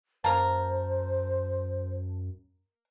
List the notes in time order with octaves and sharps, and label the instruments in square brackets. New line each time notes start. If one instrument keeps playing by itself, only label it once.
[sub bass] F#2 [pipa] A#3 A#4 [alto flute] C5 [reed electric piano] A5